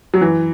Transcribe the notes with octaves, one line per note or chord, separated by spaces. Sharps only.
F#3
E3